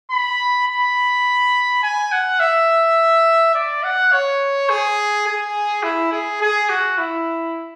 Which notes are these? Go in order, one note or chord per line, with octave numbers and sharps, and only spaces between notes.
B5
B5
G#5
F#5
E5
D5
F#5
C#5
G#4
G#4
E4
G#4
G#4
F#4
E4